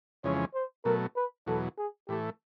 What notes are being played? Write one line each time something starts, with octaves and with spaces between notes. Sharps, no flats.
F2 C#3 E3 G#3 C#4 C#5
C5
B2 F#3 A3 A#4
B4
E2 B2 F#3 A4
G#4
A2 E3 A3 G4